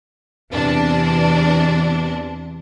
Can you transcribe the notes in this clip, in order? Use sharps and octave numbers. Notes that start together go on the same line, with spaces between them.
E2 C3 D4